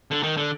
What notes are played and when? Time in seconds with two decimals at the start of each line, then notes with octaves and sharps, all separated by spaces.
0.11 D3
0.23 D#3
0.37 D3